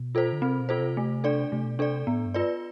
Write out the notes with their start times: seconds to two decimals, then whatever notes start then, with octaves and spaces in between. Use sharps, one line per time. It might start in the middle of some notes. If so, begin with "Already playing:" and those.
Already playing: B2
0.15 F4 A4 C5
0.33 D3
0.42 C3 C4
0.60 B2
0.69 F4 A4 C5
0.79 C3
0.97 A3
1.24 D4 A4 D5
1.52 C3 A3
1.65 B2
1.77 C3 D4 A4 D5
2.07 A2 B3
2.26 G2
2.34 F4 B4 D5